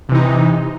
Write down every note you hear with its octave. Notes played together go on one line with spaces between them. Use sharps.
C3 E3 D#4